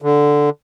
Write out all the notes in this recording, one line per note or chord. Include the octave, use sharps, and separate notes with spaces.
D3